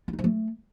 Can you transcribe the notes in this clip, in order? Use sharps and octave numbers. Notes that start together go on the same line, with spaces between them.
F4
D#4
F3
A3